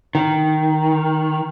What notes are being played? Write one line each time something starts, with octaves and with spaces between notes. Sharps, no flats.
D#3